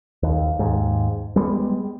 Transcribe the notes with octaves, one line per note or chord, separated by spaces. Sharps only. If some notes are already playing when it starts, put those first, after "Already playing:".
D#2
D#2 G#2
G3 G#3 B3